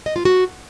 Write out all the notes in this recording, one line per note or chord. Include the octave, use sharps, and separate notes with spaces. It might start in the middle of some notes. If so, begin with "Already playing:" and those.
D#5
F4
F#4